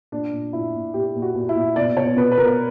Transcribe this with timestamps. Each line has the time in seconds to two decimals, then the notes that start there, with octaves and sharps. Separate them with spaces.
0.12 A#2 D4
0.32 A#2
0.53 A#2 E4
0.74 A#2
0.94 A#2 G4
1.15 A#2
1.22 F#4
1.35 A#2
1.49 E4
1.55 A#2
1.76 B2 D5
1.97 B2 C#5
2.17 B2 B4
2.32 B4
2.37 B2 A#4